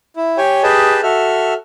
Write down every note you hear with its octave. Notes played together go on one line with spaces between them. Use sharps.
E4
G4 C#5 G5 G#5
G4 G#4 B4 D#5 G5 A5
F#4 A4 E5 F6